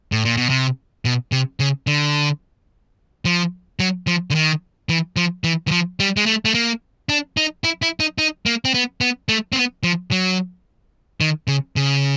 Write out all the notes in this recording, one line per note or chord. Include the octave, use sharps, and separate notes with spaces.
A2
A#2
B2
C3
B2
C3
C#3
D3
F3
F#3
F3
D3
D#3
E3
F3
E3
E3
F3
G3
G#3
A3
A3
A#3
D4
D#4
E4
E4
D#4
D#4
A#3
C4
B3
B3
A3
C4
B3
F3
F#3
D#3
C#3
C#3